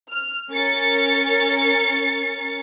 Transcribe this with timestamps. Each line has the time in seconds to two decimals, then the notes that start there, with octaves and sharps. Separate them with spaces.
0.11 F6
0.51 C#4 A#4 A6 C#7